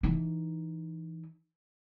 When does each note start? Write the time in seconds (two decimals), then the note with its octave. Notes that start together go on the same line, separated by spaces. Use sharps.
0.03 E3 D#4